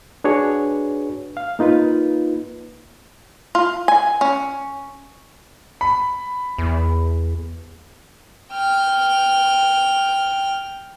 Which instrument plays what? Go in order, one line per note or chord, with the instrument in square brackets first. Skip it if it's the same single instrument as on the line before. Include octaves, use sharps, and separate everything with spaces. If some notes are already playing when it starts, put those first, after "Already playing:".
[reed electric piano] D4 F#4 G#4 B4 C#5
F5
A#3 D#4 F4 B4
[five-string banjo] F4
G#5
C#4
[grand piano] B5
[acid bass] E2
[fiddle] G5 F6